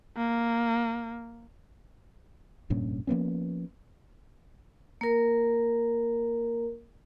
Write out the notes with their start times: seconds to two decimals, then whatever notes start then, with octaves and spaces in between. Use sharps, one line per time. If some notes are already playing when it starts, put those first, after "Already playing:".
0.17 A#3
2.70 F1 G2 A#2 C#4
3.07 F3 A#3 B3 C#4
5.01 A#3 A#4